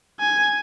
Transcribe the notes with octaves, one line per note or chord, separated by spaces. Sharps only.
G#5